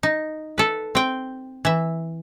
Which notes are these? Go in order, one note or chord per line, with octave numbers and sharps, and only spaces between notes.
D#4
A4 B4
C4 G5
E3 E5